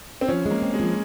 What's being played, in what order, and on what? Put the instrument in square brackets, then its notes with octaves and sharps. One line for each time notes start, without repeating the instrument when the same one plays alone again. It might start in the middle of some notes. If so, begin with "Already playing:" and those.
[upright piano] C4
[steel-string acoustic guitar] F3 [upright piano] C#4
[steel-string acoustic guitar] G#3
[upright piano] A#3
[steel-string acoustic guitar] C4
[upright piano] G#3
[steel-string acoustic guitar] F3